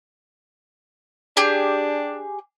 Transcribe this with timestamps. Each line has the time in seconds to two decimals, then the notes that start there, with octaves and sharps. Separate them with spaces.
1.37 D4 G4 G#4